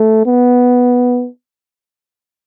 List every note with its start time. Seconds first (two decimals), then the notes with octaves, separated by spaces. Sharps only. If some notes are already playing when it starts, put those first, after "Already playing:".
Already playing: A3
0.26 B3